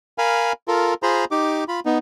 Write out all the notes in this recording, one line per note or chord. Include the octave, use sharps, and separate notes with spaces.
A#4 F5 G#5 B5
F4 A4 A#4
F4 G#4 C5 A#5 B5
D#4 G4 D6
F4 B5
B3 D#4